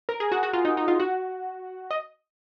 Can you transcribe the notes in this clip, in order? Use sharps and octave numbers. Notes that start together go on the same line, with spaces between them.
A#4
G#4
F#4
F#4
F4
D#4
D#4
F4
F#4
D#5